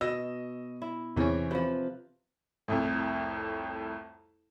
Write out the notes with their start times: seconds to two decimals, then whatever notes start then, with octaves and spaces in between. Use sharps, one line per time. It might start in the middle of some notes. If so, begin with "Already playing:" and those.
0.01 B2 D#5 E6 A#6
0.82 E4
1.16 E2 C3 E3 C#4
1.51 C3 F3 B4
2.68 C2 F2 A2